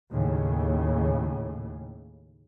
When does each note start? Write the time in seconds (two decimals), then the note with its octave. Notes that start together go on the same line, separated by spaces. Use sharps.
0.11 D#2 A2 C#3